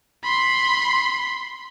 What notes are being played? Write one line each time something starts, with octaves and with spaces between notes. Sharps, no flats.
B5 C6